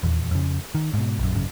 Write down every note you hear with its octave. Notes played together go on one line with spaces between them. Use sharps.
D#1 E2
F2 C#3
D#3
G#2 B2
A#1 F#2
G#1 F#2 C#3